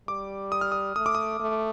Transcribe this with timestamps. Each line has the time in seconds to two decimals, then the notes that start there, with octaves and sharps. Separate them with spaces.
0.08 G3 D6
0.52 D#6
0.61 F6
0.72 D#6
0.96 A3 D#6
1.06 D6
1.15 D#6
1.40 A3